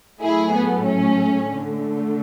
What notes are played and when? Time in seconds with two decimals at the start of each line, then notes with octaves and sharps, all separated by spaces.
0.21 A2 F#3 A3 E4 G#4
0.54 B3
0.85 C#4
1.49 D3 A3